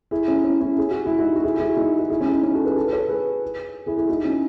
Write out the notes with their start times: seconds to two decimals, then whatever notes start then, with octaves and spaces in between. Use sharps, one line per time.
0.11 E4 G#4
0.28 C#4 E4
0.44 C#4 E4
0.60 C#4 E4
0.78 G#4
0.91 F#4
1.06 E4
1.19 D#4 F#4
1.36 F#4
1.44 E4 G#4
1.56 F#4
1.60 E4 G#4
1.77 D#4 F#4
1.99 F#4
2.10 E4 G#4
2.21 C#4 E4
2.32 D#4
2.43 C#4
2.54 F#4 A4
2.65 G#4 B4
2.77 F#4 A4
2.87 B4
2.93 A4 C#5
3.09 G#4 B4
3.86 E4 G#4
3.97 E4 G#4
4.09 D#4 F#4
4.25 C#4 E4